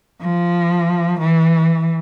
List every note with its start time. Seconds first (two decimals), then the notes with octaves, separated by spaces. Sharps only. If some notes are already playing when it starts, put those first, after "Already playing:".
0.22 F3
1.20 E3